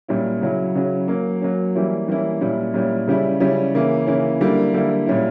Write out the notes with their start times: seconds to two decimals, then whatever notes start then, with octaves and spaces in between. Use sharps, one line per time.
0.08 A#2 G3 C#4 E4
0.41 C#3 F#3 C#4 E4
0.75 C#3 F#3 C#4 E4
1.08 F#3 A#3 C#4
1.42 F#3 A#3 C#4
1.75 E3 G3 A#3 C#4 E4
2.08 E3 G3 A#3 C#4 E4
2.41 A#2 G3 C#4 E4
2.74 A#2 G3 C#4 E4
3.07 C#3 G3 C#4 E4
3.40 C#3 G3 C#4 E4
3.75 C#3 E3 A#3 C#4 E4
4.07 C#3 E3 A#3 C#4 E4
4.41 D3 G3 A#3 E4
4.74 D3 G3 A#3 E4
5.06 A#2 G3 C#4 E4